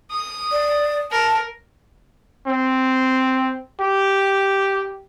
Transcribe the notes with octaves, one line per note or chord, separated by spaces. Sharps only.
D#6
D5
A#4 A5
C4
G4